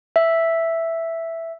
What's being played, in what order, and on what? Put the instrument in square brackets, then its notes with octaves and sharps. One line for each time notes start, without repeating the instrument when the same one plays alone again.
[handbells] E5